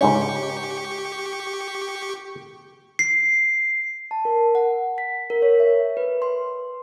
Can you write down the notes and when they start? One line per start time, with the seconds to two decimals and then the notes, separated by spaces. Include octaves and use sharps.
0.01 C#2 G#2 C#4 G4 C#6
2.99 C7
4.11 A5
4.25 A#4
4.55 F#5
4.98 B6
5.30 A#4
5.42 C#5
5.60 E5
5.97 B4
6.22 C6